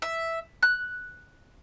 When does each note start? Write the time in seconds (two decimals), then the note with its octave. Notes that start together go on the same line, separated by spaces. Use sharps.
0.02 E5
0.63 F#6